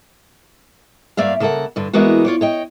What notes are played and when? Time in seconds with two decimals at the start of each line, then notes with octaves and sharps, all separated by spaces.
1.17 G2 A#3 D5 E5 F5
1.40 C#3 A#3 A4 D#5 F#5
1.76 G2 D3
1.93 E3 G#3 A#3 B3 F#4
2.25 F4 C#5 D5
2.41 C#5 D#5 G5